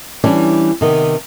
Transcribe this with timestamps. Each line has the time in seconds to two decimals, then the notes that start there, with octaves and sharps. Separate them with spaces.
0.24 E3 G3 C#4 D4
0.81 C3 D#3 B3